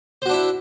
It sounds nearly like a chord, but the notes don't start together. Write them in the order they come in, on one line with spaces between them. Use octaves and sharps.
C5 F#4 D4 E4